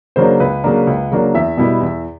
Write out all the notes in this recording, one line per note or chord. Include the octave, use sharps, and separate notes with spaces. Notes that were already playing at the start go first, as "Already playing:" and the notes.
C#3 F#3 A#3 D4 C5
C#2 B4
C#3 F#3 A#3 D4
C#2
C#3 F#3 A#3 D4
E2 E5
B2 G3 B3 E4
E2